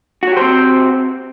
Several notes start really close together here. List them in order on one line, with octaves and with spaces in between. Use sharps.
F#4 C#5 G4 C5 C4